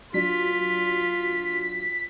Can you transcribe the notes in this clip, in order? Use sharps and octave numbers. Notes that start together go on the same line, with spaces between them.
F#3 D4 F4 B6